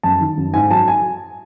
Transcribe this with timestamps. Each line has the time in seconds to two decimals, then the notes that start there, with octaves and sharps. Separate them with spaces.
0.03 F#2 A5
0.21 D#3
0.37 F#2
0.54 G#2 G#5
0.71 F#3 A5
0.88 G#5